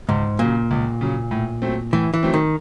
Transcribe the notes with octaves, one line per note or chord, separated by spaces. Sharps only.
C#2 G#2
A#2 C#3 F#3
C#2
C#3 F#3
A2
F#3 A3 C4
A2 E3
E3
F#3 A3 C4
D#3